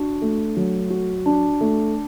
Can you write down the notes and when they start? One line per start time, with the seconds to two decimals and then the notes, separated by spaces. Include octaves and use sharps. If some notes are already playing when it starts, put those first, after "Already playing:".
Already playing: D4 F#4
0.22 A3
0.57 F#3
0.90 F#4
1.26 D4
1.61 A3